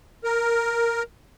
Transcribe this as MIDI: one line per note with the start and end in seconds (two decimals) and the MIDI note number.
0.24 1.03 70